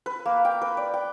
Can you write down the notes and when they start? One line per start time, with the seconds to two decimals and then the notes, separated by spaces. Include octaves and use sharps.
0.06 B4
0.26 A#3
0.45 G5
0.62 B4
0.77 D5
0.94 G5